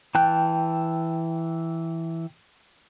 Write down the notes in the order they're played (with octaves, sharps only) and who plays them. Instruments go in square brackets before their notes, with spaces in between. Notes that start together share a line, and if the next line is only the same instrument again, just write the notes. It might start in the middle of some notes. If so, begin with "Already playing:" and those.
[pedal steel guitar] E3 A5 F#6 [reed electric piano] G5